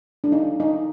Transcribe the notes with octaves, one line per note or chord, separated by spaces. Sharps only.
D4
D#4
D#4